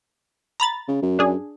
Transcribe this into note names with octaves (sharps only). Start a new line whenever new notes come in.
A#5 B5 A6
C#3
F#2
D4 G#4